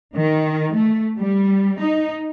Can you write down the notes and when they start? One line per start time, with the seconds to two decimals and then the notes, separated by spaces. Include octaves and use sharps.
0.15 D#3
0.73 A3
1.19 G3
1.79 D#4